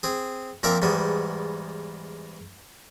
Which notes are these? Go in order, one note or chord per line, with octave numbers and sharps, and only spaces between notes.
C4 G#4
A#2 F3 C4 A#4 E5 D6
E2 G#2 G3 B3